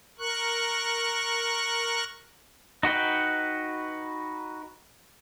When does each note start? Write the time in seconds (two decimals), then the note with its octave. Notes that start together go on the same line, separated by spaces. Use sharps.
0.19 A#4 C#6 F#6
2.83 D#4 F#4 B4 G5